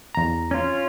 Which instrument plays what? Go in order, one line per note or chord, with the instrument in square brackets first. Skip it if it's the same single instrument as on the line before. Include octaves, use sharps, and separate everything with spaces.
[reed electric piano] E2 A#5
[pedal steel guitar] C#4 F4